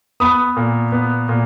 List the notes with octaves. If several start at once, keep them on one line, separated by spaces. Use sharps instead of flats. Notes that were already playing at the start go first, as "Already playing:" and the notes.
B3 B5 D#6
A#2
B3
A#2